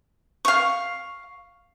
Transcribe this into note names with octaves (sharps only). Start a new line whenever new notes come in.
F5 C#6